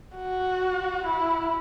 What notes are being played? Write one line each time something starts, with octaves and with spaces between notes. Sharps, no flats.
F#4
E4